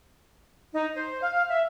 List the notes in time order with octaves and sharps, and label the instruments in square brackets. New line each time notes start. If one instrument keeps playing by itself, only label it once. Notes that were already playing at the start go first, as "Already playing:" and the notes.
[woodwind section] D#4
C5
F5
E5